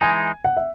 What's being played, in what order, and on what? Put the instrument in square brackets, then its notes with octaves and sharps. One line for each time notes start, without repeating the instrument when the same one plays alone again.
[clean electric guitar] E3 G#3 D#4 [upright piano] G#5
[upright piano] F#5
E5